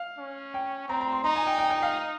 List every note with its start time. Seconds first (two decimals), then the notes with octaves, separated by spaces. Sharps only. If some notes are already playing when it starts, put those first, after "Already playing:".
Already playing: F5
0.18 C#4
0.54 G5
0.89 C4 A#5
1.01 A#5
1.12 C6
1.24 D#4 A#5
1.36 G#5
1.47 G5
1.58 G5
1.70 G5
1.82 F5